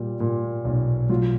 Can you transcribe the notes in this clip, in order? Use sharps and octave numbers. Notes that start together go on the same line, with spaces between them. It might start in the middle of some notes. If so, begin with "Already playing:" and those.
Already playing: A#2 G3
A#2
B1
F#3 F4